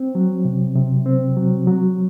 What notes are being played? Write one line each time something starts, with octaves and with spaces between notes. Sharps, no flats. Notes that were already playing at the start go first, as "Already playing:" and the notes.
Already playing: C4
F#3
C3
C3
C4
F#3
F#3